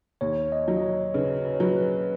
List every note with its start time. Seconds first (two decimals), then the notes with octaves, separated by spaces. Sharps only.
0.21 D#2 C#5
0.52 D#5
0.68 F#3
0.77 D#5
0.83 C#5
1.14 C#3 B4
1.45 B4
1.54 C#5
1.60 F#3 B4
1.76 B4